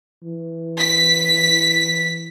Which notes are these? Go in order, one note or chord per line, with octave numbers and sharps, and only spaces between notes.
E3
B6